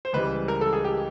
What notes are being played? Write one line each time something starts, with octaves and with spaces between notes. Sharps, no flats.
C5
C#2 C#3 E3 G3 B4
A#4
A4
G#4
G4